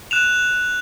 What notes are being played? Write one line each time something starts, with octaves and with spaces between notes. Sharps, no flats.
F#6 E7 F7